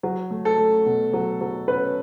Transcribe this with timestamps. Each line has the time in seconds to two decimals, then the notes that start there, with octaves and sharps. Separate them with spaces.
0.03 F#3
0.31 A3
0.45 A4
0.58 A3
0.86 B2
1.13 F#3
1.41 F#3
1.68 C#4 B4